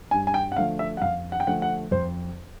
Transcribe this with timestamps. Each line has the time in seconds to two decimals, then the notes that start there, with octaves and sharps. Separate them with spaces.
0.11 G2 G#5
0.27 G#5
0.34 G5
0.52 F#5
0.56 D3 F3 A3 F5
0.79 E5
0.97 F#5
1.02 F2 F5
1.32 F#5
1.40 G5
1.47 D3 F3 A3 F#5
1.62 F#5
1.91 F2 C5